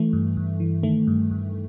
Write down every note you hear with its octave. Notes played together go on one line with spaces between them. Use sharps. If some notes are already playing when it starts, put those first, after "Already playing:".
Already playing: E3 A3
G2
G2
E3
D#3 A3
G2
G2